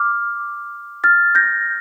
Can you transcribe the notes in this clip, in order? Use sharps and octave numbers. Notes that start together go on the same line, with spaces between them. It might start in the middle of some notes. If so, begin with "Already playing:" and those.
Already playing: D6 F6
F6 A6
G6 A#6